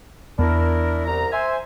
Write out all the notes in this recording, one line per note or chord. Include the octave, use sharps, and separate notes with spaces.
E2 B3 D4 E4 A#4
C2 A#5
C5 E5 G#5